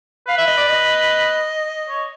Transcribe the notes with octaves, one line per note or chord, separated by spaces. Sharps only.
B4 F5
E5
D#5
D5
D#5
C#5